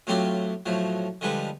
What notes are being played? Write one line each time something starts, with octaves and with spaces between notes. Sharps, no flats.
A2 F#3 C4 F4 G4 C6
A2 F3 F#3
D3 F3 G3 G#3 B4